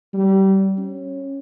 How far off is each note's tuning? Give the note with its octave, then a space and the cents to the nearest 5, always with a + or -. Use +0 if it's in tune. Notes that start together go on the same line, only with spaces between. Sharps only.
G3 -25
C#4 -15